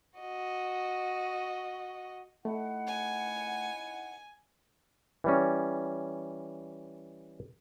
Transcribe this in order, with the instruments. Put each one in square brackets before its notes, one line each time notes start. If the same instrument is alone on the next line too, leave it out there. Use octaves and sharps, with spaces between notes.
[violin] F#4 D#5
[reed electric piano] A3 [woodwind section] D#4 E4 F#5
[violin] G#5
[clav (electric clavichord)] E3 G3 C#4